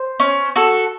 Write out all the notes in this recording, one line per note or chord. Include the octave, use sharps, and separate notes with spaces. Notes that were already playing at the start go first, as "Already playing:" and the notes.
Already playing: C5
C#4
F#4 A4